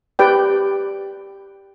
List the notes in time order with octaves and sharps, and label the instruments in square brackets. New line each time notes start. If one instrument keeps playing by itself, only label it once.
[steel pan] G4 B4 D5 G5